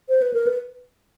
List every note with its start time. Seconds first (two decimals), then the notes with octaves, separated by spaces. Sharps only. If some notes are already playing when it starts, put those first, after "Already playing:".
0.09 C5
0.22 B4
0.34 A#4
0.47 B4